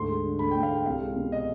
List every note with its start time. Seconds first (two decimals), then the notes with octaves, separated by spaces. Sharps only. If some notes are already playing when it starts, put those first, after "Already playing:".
Already playing: D2 G#2 C6
0.09 G#3
0.25 D3
0.39 D2 B5
0.51 G5
0.55 D2
0.63 F5
0.70 G#3 G5
0.86 C2 F5
1.01 G#3
1.16 B2
1.32 D#5